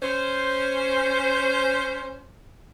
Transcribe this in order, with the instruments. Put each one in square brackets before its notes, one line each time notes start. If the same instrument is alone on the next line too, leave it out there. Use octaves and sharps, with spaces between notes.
[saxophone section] C#4 C5